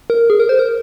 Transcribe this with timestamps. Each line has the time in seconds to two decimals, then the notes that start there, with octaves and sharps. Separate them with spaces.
0.10 A#4
0.30 G#4
0.40 A#4
0.49 C5
0.59 A#4